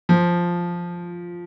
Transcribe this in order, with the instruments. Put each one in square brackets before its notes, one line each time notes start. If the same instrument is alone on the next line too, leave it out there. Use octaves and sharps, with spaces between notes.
[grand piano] F3